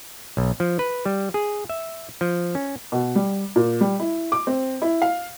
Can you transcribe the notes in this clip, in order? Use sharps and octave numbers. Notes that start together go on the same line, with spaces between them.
B1
F3
B4
G3
G#4
E5
F3
C#4
B2
G3
A#2
G3
E4
D6
C4
E4
F5